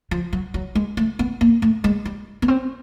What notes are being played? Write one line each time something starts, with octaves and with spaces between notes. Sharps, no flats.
F3
F#3
F#3
G#3
A3
B3
A#3
A3
G#3
G3
B3
C4